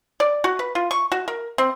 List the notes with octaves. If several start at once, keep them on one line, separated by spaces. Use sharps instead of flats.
D5
F#4
B4
F4
C#6
F#4
A#4
C4